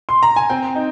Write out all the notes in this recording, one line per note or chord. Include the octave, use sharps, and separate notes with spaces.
C6
A#5
G#5
C4 G5
D#4